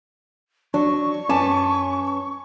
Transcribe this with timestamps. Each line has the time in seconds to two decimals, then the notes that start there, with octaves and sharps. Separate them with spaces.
0.74 F#3 D4 D5 C#6
1.29 F#2 C#4 B4 G#5 A5 D6